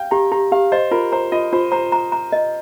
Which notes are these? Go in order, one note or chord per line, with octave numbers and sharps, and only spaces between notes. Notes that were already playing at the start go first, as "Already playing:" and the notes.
Already playing: F5 G5
G4 A#5
G4 A#5
G4 F5
C5 D#5
F4 A#4
C5 A#5
F4 D#5
F4 C5
C5 A#5
A#5
A#5
D#5